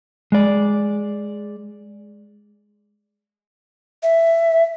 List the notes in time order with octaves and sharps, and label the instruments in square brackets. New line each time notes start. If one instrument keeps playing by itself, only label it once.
[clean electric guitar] G#3 D5
[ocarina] E5